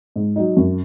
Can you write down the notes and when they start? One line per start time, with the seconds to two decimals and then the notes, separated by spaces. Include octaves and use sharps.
0.16 G#2
0.36 F#3 D#4
0.57 F#2